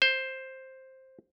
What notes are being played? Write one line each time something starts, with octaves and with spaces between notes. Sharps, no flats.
C5